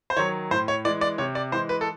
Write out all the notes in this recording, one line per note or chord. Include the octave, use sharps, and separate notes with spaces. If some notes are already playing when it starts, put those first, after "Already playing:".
C5
D#3 F#3 C#5
A2 C5
C#5
E3 G#3 D5
D5
C3 C#5
D5
E3 G#3 C5
B4
A4